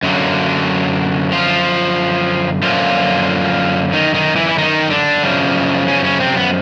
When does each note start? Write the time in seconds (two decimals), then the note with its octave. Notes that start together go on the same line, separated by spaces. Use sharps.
0.03 F#2 D3 F#3 A#3
1.32 F3 F4
2.62 F#2 D3 F3 A#3 F4
3.93 D#3 D#4
4.14 D#3 D#4
4.36 E3 E4
4.49 E4
4.58 D#3 D#4
4.90 D3 D4
5.23 F#2 C#3 F3
5.87 C#3 C#4
6.04 C#3 C#4
6.20 C3 C4
6.37 B3